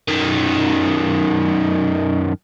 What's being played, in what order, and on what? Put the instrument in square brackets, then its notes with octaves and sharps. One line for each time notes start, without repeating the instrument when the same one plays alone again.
[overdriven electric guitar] F#2 D#3